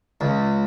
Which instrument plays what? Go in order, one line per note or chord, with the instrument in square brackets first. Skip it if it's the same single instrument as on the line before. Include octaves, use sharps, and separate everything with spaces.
[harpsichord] C#2